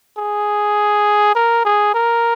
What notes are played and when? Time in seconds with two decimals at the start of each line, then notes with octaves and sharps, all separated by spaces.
0.18 G#4
1.35 A#4
1.65 G#4
1.94 A#4